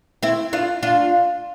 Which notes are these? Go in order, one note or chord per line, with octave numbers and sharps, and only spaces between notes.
C4 E4
D4 F4
D4 F4